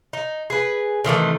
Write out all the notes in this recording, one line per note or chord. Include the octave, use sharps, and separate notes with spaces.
D#4
G#4 B4
C3 D#3 E3 A3